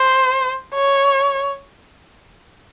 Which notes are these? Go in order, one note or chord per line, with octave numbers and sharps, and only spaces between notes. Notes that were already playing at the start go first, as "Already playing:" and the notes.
Already playing: C5
C#5